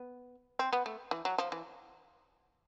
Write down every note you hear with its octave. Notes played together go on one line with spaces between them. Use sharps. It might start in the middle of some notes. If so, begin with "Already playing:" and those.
Already playing: B3
C4
B3
A3
E3
F#3
F3
E3